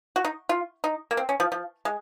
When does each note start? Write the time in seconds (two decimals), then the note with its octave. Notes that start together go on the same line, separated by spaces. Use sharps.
0.16 F#4
0.24 D#4
0.49 F4
0.84 D#4
1.11 A#3
1.17 C4
1.29 C#4
1.40 F3
1.52 F3
1.85 G#3